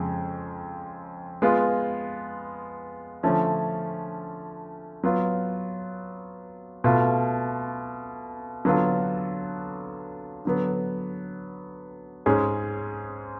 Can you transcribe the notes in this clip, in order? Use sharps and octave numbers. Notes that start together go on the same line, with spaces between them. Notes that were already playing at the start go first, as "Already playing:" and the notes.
Already playing: F2 C#3 G#3
G#3 B3 F4
D3 F3 A3 C#4
F#3 B3 F4
B2 A3 F4
D3 F#3 B3 F4 A4
D3 F#3 B3
G#2 G#3 C#4 G#4